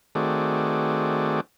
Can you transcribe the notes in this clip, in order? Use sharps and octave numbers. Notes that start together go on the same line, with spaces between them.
D#3 A3 C4 F#4 G#4 D5